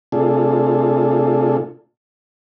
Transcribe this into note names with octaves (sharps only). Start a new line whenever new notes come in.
C3 A3 D4 F4 G#4 A4